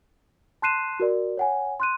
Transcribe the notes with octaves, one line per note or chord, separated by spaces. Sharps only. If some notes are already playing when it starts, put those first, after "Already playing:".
A5 C6 F#6 C7 D#7 E7
F#4 A#4 D5
C#5 F#5 G#5
C6 F#6 D#7